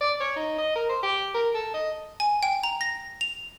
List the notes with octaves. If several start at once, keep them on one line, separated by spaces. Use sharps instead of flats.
D5
C#5
D#4
D#5
A#4
C5
G4
A#4
A4
D#5
G#5
G5
A#5
A#6
F7